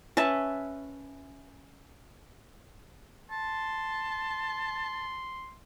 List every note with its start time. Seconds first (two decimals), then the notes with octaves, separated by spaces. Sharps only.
0.17 C#4 B4 E5 A5
3.31 A5 C6